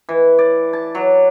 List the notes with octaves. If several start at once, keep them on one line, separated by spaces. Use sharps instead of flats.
E3
D5
A5
F#3